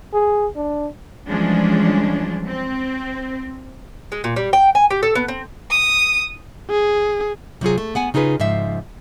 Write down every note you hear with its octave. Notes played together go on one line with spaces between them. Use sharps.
G#4
D4
E3 F3 G3 G#3 C#4 D4
C4
G#3
A#2
G3
G5
G#5
G4
A4
B3
C4
D#6
G#4
C3 F#3 F4 G#4
A3
B3 F#5 G#5
C#3 D#4 F4 G#4 B4
G#2 C#3 F3 E5